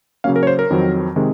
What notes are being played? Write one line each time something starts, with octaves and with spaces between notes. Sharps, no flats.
C#3 F#3 A#3 C#4 F5
A#4
C#5
C5
A#4
F2 D#3 F#3 C4
C3 D#3 G#3